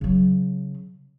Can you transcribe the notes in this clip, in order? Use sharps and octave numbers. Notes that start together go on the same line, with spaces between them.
C#3 F#3